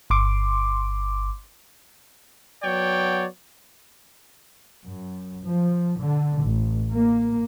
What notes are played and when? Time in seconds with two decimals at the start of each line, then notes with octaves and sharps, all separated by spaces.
0.10 G1 C6 D6
2.63 F#3 B3 C#5 D5 G5
4.86 F#2
5.46 F3
6.01 D3
6.45 A1
6.92 A#3